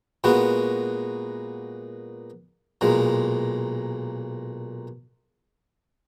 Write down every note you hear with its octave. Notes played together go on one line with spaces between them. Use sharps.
A#2 G#3 B3 F#4
B1 A#2 G#3